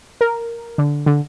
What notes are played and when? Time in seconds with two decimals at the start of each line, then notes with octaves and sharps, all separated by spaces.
0.21 A#4
0.78 D3
1.06 D3